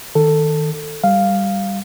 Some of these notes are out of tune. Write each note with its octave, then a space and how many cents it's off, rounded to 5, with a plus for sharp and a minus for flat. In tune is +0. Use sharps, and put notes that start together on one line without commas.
D#3 +0 A4 +15
G3 +0 F5 +0